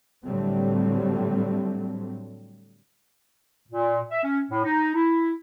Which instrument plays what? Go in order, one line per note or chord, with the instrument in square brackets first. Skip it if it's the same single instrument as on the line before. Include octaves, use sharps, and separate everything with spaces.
[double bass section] A2 D3 F#3 G3 A3 C4
[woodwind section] A#2
E5
C#4
A2
D#4
E4